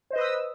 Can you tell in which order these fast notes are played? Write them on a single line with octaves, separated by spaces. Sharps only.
C5 D#5 B4 D#6 E6